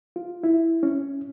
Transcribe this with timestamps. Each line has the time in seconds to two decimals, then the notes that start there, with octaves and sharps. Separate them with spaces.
0.16 F4
0.44 E4
0.83 C#4